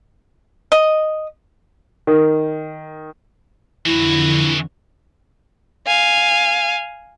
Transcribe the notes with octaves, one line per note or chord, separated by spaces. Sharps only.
D#5
D#3
F2 D3 E3 E4 F#4
F5 G#5